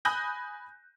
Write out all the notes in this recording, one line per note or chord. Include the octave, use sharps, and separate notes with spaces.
G#5 B5 D#6 F#6 G6 A#6